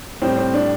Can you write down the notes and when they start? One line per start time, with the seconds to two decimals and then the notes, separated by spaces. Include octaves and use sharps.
0.22 A2 G3 C4
0.37 C4
0.54 D4